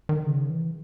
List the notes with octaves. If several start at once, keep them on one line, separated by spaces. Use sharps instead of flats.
D#3
C#3
E3